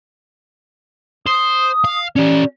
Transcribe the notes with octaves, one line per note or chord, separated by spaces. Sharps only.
C5 D#6
F5
C#4 G4 D5